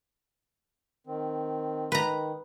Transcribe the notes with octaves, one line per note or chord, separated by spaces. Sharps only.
D#3 C4
D#3 B4 A#5